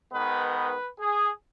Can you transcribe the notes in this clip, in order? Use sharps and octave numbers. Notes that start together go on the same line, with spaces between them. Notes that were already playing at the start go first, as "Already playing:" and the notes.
G#2 D#3 B3 B4
B4
G#4